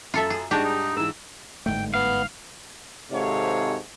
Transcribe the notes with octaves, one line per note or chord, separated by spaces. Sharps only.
F#2 F4 A4 E5
G#4
G#2 G3 G#3 D4 F#4 G4
D#4
G#2 E3 E6
G1 G#2 A3 G5
B3 F5
G#1 G#2 C3 A4 C#5 F5